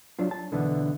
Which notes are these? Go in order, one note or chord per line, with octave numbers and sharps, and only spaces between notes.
F#3 D4 F4
A5
B1 D3 E3 B3